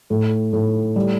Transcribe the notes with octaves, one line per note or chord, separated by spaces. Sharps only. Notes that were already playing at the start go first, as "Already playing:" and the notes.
A2
A2
G3